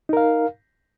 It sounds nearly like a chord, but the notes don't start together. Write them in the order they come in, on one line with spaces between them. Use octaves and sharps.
D#4 A#4 F5